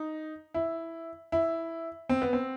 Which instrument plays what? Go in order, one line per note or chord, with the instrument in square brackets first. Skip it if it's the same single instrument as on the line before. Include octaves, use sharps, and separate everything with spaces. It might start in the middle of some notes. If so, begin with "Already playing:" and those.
Already playing: [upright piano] D#4
E4
E4
C4
B3
C4